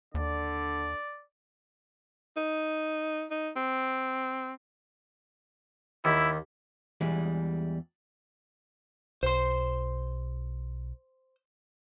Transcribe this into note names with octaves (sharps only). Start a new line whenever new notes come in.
D#2 D3 D5
D#4
D#4
C4
D#2 E4
E2 E3 G3 G#3
B1 C5 C6